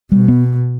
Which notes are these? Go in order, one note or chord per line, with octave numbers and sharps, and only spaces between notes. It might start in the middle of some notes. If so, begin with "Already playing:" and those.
B2 G3
B3